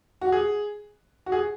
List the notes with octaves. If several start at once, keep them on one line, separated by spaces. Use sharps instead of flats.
F#4
G#4
F#4
G#4